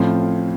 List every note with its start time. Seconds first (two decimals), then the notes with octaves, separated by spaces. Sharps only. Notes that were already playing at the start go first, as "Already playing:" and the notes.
Already playing: A1 A2 F3 C4 F4